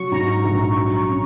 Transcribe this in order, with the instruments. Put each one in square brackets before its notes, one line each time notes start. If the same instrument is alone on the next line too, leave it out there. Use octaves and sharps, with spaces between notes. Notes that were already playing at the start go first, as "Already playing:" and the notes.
Already playing: [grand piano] F#3 [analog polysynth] C#6
[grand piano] G#2 [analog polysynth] A#5
[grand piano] A#1
F#3
C#4